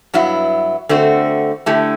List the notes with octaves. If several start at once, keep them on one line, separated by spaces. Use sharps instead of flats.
G2 F#3 B3 E4
D3 A3 C4 F#4
D3 A3 E4 G4